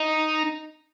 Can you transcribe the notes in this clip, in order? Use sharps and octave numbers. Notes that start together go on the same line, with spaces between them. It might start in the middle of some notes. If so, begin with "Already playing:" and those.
Already playing: D#4